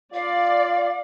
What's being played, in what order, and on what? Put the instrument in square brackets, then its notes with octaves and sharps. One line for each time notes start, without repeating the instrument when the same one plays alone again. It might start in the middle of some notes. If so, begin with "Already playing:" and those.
[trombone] F4 [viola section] D5 [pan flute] F5